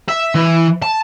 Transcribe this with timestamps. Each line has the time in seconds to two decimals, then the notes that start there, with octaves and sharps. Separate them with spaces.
0.09 E5
0.35 E3
0.82 A5